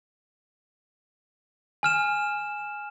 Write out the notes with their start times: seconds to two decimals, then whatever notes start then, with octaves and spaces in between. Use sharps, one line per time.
1.83 G#5 F6 E7